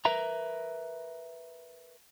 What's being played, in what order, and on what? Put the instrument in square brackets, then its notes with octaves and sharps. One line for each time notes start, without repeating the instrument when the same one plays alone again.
[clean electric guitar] A#4 B4 E5 A#5